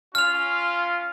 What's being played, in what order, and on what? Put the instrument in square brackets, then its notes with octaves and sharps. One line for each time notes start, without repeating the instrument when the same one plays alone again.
[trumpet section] C#4 F4 [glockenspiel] F6 F7